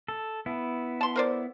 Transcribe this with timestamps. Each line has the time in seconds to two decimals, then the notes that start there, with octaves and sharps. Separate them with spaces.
0.08 A4
0.46 B3 E4
1.01 A5 C6
1.16 A#4 C5 D5